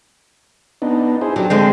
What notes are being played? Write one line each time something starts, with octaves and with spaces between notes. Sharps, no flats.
B3 D4 D#4
E4 G#4 C5
F#3 D4 G4
D3 G#3 C4